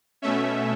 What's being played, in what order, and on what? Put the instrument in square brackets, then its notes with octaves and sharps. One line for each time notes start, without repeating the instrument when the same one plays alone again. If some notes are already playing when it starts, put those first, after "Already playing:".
[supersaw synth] B2 A3 C#4 E5